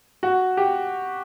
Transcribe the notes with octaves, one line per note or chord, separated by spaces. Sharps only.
F#4
G4